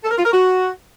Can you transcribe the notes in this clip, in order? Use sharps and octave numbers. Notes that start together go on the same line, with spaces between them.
A4
A#4
F4
A#4
F#4